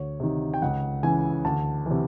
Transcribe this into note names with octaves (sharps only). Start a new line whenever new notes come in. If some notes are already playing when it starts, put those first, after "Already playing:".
Already playing: D2 C#5
C3 D#3
G5
C#2 F#5
C#3 E3 G#5
D2 A5
C3 E3